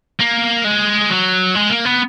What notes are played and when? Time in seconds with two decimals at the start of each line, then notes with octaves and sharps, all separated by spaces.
0.20 A#3
0.65 G#3
1.10 F#3
1.55 G#3
1.70 A#3
1.85 B3